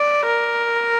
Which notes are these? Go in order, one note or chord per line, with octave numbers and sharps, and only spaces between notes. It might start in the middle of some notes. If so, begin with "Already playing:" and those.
Already playing: D5
A#4